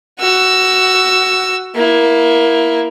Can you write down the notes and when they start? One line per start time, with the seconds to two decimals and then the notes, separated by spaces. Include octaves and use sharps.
0.20 F#4 E6
1.75 A#3 E4